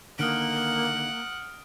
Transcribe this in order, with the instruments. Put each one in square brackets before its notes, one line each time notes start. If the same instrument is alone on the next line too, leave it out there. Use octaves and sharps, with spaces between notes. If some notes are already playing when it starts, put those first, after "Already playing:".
[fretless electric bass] D3 D#3 [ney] A#3 [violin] F#5 [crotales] D#6 F6 D7